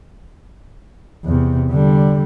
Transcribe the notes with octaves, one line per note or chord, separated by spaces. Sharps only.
E2 C3
D3 G3